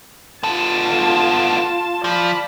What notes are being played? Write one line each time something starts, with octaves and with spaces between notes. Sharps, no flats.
B3 F4 A4 A5
F3 D5 B5